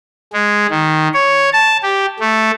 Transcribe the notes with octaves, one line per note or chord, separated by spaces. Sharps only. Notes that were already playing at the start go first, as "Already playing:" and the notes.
G#3
D#3
C#5
A5
G4
A3